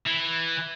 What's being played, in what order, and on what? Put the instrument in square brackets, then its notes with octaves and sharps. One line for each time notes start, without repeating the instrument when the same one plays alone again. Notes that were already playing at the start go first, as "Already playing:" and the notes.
[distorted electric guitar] E3